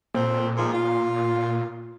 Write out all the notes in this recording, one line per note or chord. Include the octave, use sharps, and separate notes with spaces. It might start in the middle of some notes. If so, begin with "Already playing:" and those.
F2 A#2 C4
G#2 D#3 F3
F4